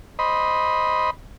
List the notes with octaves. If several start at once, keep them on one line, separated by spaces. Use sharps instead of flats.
C5 D#5 B5